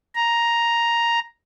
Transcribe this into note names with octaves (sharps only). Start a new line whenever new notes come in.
A#5